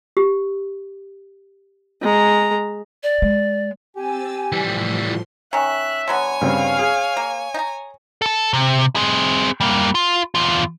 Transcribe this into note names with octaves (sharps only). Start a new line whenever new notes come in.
G4
G#3 A#5
D5
G#3
C4 G4 G#5 E6 A6
A2 E3 F3 G3 C6
D#3 C#4 E5 F#6
D3 F#3 B3 C#5 G#5
G2 C#3 C4 F5
G#4
A#3
D#4 A#5
A4 A5
C3
C4 G#4
G3 A#3
F4
E2 F4